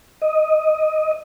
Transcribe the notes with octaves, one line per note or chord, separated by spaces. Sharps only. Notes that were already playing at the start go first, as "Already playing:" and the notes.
D#5